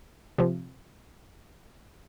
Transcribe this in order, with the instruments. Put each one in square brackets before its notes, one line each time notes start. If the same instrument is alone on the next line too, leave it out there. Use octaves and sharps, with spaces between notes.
[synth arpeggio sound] C3 F3